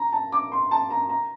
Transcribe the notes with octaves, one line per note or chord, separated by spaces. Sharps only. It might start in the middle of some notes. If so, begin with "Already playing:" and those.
Already playing: A#5
A5
D6
C6
A5
A#5
A#5